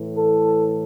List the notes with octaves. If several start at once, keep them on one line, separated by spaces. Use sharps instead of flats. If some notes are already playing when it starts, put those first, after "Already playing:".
Already playing: A2 E3
A4